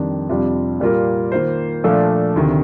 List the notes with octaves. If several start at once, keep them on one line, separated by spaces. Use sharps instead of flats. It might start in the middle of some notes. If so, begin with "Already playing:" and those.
Already playing: F2 D#3 G3 D4
F2 C3 G3 D4 F4
A#2 G3 A#3 F4 A#4
D#3 A#3 F4 C5
A#2 F3 A3 D4 A4
D2 C3 D#3